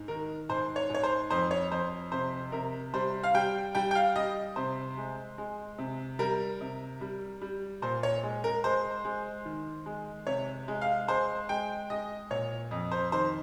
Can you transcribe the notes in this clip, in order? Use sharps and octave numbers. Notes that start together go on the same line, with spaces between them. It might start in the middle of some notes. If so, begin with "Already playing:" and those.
Already playing: G#2
D#3 A#4
G#2 C5
C#5
G#2 C#5
C5
F2 C5
C#5
F2 C5
C3 C5
C3 A#4
G3 C5
F5
G3 G5
G3 G5
G5
F5
G3 D#5
C3 C5
G#3
G#3
C3
G3 A#4
C3
G3
G3
A#2 C5
C#5
G#3
A#4
G#3 C5
G#3
D#3
G#3
C3 C#5
G#3
F5
G#3 C5
G#3 G5
G#3 D#5
A#2 C#5
F2
C5
D#3 C5